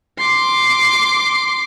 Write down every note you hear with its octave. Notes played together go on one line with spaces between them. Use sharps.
C6 D6